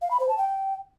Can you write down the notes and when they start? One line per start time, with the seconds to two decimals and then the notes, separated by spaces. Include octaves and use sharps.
0.02 F5
0.11 B5
0.20 C5
0.29 A5
0.38 G5